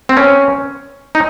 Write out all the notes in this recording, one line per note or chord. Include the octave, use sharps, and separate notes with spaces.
C4
C#4
D#4